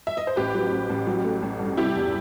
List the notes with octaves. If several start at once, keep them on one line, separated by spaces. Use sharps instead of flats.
E5
D#5
C5
A1 G4 B4
F#3
A1
A1
F#3
A3
A1
G2
C3 E4 G4
E2